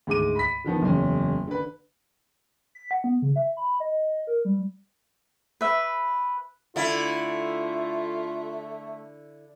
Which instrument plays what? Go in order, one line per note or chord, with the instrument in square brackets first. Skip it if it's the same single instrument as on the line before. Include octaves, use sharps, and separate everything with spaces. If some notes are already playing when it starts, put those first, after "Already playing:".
[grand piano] D2 G#2 G#3 D6 D#7
B5 B6
D3 D#3 F3 B3
F#1 E2 C#4
D3 B4
[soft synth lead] B6
F#5
B3
C#3
E5
B5
D#5
A#4
G3
[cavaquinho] B4 E5
[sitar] D3 E4 [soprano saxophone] A3 [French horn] F4